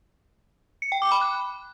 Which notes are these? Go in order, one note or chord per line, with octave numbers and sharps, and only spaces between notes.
C#7
G5
D6
B5
F#6